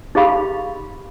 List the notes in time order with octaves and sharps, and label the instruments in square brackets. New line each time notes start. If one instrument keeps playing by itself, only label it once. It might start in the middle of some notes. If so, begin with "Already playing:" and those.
[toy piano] D#4 G4 G#4 F5 B5 C6